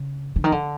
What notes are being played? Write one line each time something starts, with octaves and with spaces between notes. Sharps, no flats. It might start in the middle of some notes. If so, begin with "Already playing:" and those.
Already playing: C#3
D3
D#3
D3